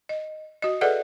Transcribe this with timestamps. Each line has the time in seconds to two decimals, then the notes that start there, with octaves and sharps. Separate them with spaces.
0.09 D#5
0.62 F#4 D#5
0.81 G#4 A4 B4 D5 E5 F#5